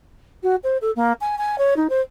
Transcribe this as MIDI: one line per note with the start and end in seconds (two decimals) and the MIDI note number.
0.43 0.56 66
0.63 0.77 72
0.81 0.91 69
0.96 1.13 58
1.21 1.36 80
1.38 1.56 80
1.58 1.74 73
1.76 1.87 63
1.89 2.01 72